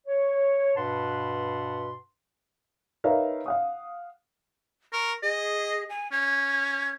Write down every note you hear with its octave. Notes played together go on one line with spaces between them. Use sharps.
C#5
G2 B2 B4 F#5 A5 C6
D#4 A#4 B4 C#5 E5 F5
F5 F#5 D#6
A#4 C#6
G#4 D#5
G#5
C#4 G#6